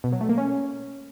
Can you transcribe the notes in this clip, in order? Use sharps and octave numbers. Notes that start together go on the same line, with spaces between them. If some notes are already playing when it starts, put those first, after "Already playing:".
B2
F#3
A3
A#3
C#4